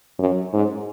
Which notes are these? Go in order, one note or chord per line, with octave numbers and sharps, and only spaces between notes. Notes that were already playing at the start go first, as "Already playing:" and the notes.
F#2
G#2